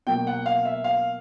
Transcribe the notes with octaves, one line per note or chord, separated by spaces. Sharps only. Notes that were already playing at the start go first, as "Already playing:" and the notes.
B2 F#3 A#3 G5
F#5
F5
E5
F5